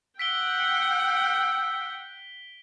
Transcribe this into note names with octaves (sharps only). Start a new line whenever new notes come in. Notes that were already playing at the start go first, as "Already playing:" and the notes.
F#5 G5 E6 B6 D7 G7